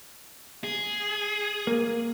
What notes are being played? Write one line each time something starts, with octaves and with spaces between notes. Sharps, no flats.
G#4
A#3